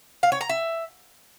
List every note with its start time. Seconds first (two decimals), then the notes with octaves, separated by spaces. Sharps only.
0.23 F5
0.32 C#5
0.41 A#5
0.49 E5